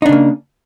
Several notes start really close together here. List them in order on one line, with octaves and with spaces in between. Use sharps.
D#4 D4 C#3 A#3